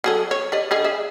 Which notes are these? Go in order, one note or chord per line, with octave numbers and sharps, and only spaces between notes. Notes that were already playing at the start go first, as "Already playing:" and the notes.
F#3 G#4 A4
C#5
G4 D5 D#5
D3 G#4 D#5
G#4 E5